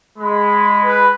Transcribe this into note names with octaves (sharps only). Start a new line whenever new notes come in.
G#3 B5
B4